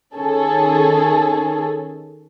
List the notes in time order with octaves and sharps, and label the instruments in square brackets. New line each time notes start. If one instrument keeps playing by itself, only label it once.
[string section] D#3 C#4 G#4 A4